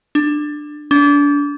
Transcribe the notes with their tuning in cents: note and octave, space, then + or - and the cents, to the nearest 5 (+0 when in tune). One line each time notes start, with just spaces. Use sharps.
D4 +15
D4 -30